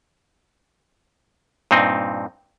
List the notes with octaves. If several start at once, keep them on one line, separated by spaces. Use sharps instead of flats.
G2 A#2 C4 D#4